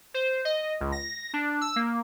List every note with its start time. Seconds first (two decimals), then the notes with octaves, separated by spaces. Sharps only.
0.14 C5
0.45 D#5
0.81 C#2
0.92 A#6
1.34 D4
1.61 E6
1.76 A#3